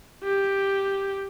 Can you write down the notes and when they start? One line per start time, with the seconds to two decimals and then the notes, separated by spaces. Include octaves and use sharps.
0.23 G4